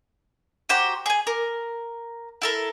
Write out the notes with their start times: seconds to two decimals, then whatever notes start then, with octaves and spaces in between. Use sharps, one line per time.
0.69 F#4 G4 C5 A#5
1.06 G#4 G#5
1.27 A#4
2.42 E4 A4 A#4